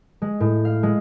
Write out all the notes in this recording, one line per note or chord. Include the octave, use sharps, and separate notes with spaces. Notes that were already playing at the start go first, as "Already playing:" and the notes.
G#3
A2
F5
G#3